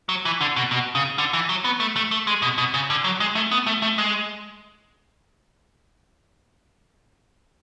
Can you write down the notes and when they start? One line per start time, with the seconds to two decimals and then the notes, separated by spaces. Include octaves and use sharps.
0.09 F#3
0.25 E3
0.41 D3
0.56 B2
0.71 B2
0.95 C#3
1.18 D3
1.33 E3
1.49 F#3
1.64 B3
1.80 A3
1.96 A3
2.11 A3
2.27 G#3
2.42 B2
2.58 B2
2.74 C#3
2.90 D3
3.04 F#3
3.20 G#3
3.35 A3
3.51 B3
3.66 A3
3.82 A3
3.98 G#3